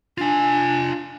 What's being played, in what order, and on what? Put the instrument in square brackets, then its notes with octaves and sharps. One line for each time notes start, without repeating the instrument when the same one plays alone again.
[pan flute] D4 [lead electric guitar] F4 G#5